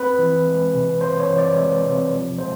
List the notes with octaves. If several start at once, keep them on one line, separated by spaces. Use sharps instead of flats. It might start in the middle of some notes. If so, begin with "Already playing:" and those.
Already playing: C4 B4
E3
G#3
C3
C4 C5
C#5
E3
D5
G#3
C3
F3
G#3 C5